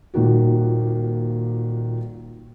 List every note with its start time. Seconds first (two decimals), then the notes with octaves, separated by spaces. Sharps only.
0.14 D#1 A#2 D#3 F#4